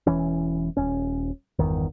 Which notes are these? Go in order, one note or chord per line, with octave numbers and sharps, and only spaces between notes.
E1 F2 E3 C#4
D#1 C#4
G1 E2 D#3